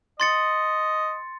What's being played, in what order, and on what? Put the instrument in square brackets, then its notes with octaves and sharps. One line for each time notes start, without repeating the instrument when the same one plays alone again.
[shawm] D#5 [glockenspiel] C6 A6 C#7